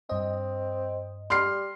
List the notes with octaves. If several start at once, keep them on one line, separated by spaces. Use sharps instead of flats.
G2 C4 D#5
G3 C6 F6 C7